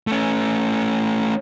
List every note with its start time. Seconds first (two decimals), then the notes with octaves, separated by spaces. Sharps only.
0.07 A3 C#4